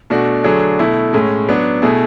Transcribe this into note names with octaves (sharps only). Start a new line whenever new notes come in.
B2 A3 D4 F#4
D3 F#3 A3 D4 G#4
B2 A3 E4
A2 G#3 C#4
F#3 B3 D4
B2 A3 E4 G#4